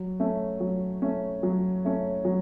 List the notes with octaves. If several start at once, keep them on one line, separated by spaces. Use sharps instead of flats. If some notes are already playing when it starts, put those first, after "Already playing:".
Already playing: F#3
A3 C#4
F#3
A3 C#4
F#3
A3 C#4
F#3